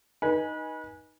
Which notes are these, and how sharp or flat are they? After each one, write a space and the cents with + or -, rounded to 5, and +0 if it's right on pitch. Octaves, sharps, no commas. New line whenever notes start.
D#4 +0 B4 -35 G#5 +0